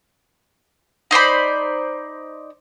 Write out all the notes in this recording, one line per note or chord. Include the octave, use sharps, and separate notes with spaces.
D#4 C5 D5 B5